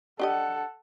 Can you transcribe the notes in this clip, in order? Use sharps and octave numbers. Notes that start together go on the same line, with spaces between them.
D4 G4 A4 D#5 F#5